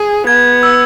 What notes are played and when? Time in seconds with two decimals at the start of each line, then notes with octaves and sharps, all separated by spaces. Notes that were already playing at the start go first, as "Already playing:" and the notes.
Already playing: G#4
0.27 B3 G#6
0.63 E6